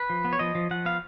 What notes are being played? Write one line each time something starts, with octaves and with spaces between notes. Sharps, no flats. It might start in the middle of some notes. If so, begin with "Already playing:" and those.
Already playing: B4
F3
B3
C#5
F3 D#5
F3
F3 F#5
B3 F5